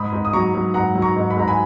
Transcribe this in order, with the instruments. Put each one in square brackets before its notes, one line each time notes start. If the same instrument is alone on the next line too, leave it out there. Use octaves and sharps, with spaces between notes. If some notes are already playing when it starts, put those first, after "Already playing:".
Already playing: [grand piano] G#2 B5 D#6
G#2
D#6
F#3 A#5 C#6
F#3
G#2 F#5 A#5
F#3
A#5 C#6
G#2
B5
G#2 A#5
G#5 B5